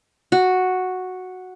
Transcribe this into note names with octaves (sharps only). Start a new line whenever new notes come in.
F#4